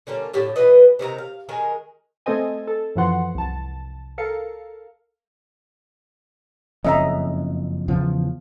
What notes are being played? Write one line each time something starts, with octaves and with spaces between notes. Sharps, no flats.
D3 G3 A#3 C#4
A2 D3 G4 A5
E3 F4 B4 D#5
C3 D#3 F#4 A#5
F5
D#3 G#3 G#4 A#4
A3 C4 A4 C5 D#5 G#5
A4
F#2 E3 F3 F#4 F#5 C6
C2 A5
A4 A#4 F5 C#7
F#1 F2 C#4 D#5 E5 A#5
E2 C#3 F3